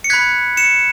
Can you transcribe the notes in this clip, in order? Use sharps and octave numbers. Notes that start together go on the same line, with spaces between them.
C#7
B5 F#6 G#6 B6
C#7 E7